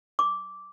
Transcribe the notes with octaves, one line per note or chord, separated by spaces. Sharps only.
D6